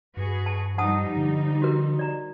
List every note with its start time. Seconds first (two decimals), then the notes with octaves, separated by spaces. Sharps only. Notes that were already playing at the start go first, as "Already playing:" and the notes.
0.17 G2 F#4 G#4 B4
0.46 A5
0.78 F3 G3 D#4 F#5 A5 D#6
1.17 D3
1.62 F#4 A#4
1.99 D5 A#5